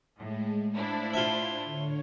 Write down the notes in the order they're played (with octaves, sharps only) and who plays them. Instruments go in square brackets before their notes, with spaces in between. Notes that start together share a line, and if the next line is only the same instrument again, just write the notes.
[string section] A2 [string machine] G#3
[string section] A2 D4 E4 [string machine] C5 F5
[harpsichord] F4 E5
[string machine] D3 C#5